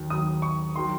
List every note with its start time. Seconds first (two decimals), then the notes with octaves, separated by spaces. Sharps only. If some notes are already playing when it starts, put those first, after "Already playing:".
Already playing: D#2 D#3 F#3
0.10 D#2 D#3 F#3 D#6
0.42 C#6
0.76 D#3 F#3 C6